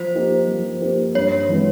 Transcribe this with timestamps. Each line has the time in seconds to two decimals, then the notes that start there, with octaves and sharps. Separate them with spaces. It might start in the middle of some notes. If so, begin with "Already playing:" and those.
Already playing: F3 C5
0.15 A#3 D#4 G4
0.48 F3
0.81 A#3 D#4 G4
1.15 G2 C#5
1.49 E3 G#3 B3